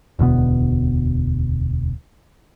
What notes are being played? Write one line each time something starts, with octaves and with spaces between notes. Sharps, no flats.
E1 D2 B2 B3